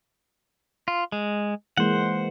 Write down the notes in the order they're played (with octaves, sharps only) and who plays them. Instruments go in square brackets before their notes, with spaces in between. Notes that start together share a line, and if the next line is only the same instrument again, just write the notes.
[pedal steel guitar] F4
G#3
[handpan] E3 G#3 A#3 [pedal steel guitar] C5 F#5